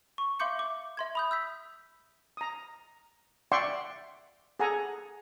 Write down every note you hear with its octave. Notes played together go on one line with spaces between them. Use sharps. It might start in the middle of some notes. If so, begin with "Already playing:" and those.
C#6
E5 F5 C6 D6 G6 C#7
D6
E5 C6 G#6
B5 D#6 G6
E6 G6 B6
A#5 D#6
D5 E5 F#5 G5 C6 C#6
G#4 A4 F#5 G#5 A#5